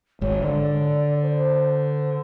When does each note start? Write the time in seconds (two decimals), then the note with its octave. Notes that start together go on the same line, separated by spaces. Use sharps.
0.21 G#1 G#2 C#5
0.42 D3 D5
1.22 C5